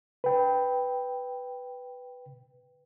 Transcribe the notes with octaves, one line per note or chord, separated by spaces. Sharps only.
B4 G5